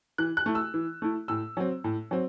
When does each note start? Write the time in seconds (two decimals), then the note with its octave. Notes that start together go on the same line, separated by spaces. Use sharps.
0.18 E3 F#6
0.37 F#6
0.46 A3 E4
0.55 E6
0.74 E3
1.02 A3 E4
1.28 A2 E6
1.57 F#3 C4
1.84 A2
2.11 F#3 C4